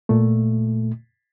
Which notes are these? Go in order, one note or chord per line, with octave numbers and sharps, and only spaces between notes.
A#2 A3